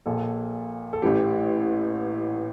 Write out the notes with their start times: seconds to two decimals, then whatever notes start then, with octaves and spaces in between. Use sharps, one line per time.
0.06 A#1 A#2 A4
0.93 A4
1.02 A1 A2 E3 G4